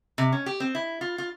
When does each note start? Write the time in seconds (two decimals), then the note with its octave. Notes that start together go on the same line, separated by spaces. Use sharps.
0.18 C3
0.33 C#4
0.46 G4
0.60 C4
0.75 E4
1.01 F4
1.18 F4